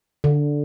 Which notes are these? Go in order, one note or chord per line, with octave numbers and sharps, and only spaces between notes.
D3